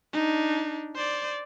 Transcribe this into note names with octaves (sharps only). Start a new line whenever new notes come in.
D4 D#4
C5 D5